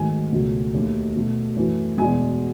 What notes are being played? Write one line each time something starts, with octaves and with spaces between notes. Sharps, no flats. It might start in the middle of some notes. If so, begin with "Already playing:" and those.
Already playing: G#2 D#3 F#3 A3 G#5
C#2 B2 F#3 A3
D#2 D#3 A3
B2 A3
F#2 E3 A3
E2 B2 G#3 G#5